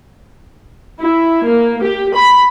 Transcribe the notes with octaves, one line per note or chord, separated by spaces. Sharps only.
E4
A#3
G4
B5